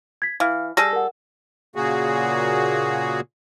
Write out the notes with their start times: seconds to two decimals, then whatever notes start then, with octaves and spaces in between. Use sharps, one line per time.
0.22 G#6 B6
0.40 E3 F5 F6
0.77 G3 G#4 A4 A#6
0.93 A#4 F#5
1.76 A#2 C#3 A#3 F#4 G#4